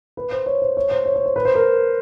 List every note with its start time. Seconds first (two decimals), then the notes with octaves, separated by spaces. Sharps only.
0.17 B4
0.32 C5
0.46 C#5
0.62 C5
0.77 C#5
0.91 C5
1.06 C#5
1.16 C#5
1.26 C5
1.36 B4
1.45 C5
1.55 A#4